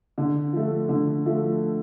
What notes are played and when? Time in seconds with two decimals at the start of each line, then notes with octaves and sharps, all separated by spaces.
0.18 D3
0.53 F3 A3
0.89 D3
1.26 F3 A3